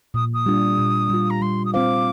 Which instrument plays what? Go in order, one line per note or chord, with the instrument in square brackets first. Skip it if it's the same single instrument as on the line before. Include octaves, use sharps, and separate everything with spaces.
[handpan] A#2 [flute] D#6
[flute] D#6
[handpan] G3 D4 F4
A#2
G3 D4 F4
[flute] A#5
[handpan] G3 [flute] C6
[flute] D#6
[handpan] C4 F4 C5 F5 [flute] D6